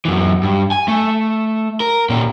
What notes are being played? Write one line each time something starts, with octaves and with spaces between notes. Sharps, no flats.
F#2 E3
G2
G#5
A3
A#4
A#2 C#4